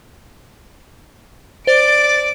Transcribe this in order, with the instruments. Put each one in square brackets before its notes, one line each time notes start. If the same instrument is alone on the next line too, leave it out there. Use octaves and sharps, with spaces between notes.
[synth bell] C5 [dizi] D5 [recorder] A6 [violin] D7